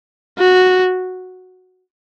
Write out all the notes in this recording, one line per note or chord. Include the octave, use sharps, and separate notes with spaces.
F#4